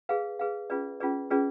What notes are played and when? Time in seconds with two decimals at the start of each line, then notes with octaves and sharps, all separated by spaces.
0.09 G#4 B4 F5
0.39 G#4 B4 F5
0.70 C#4 F4 G#4 B4 D5
1.00 C#4 F4 G#4 B4 D5
1.30 C#4 F4 G#4 B4 D5